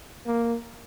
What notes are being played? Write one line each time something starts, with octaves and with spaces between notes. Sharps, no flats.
A#3